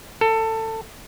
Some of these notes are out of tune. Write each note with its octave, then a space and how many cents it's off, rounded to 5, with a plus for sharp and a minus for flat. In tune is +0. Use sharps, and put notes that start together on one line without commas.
A4 +20